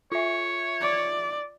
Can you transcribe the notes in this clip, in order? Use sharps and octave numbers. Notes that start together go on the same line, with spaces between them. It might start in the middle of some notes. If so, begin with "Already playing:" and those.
F4 C#5 E5
D5